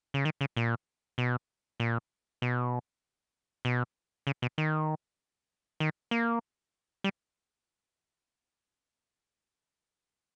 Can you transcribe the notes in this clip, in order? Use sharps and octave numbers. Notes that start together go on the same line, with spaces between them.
C#3
D#3
C#3
A#2
B2
A#2
B2
B2
C#3
B2
D#3
D#3
A#3
G3